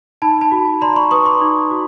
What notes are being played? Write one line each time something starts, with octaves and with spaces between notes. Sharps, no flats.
D#4 A5 B5
A5 B5
F#4
D5 A#5 C6
B5 C#6
B4 C#6 D#6
C6 D6
D#4
F#4